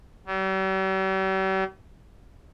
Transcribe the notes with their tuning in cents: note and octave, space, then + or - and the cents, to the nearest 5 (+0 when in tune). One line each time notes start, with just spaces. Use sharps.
G3 -45